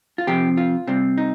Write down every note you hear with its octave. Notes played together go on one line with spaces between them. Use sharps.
F4
C3 F3 C4 G4
F4
C3 G3 C4
D#4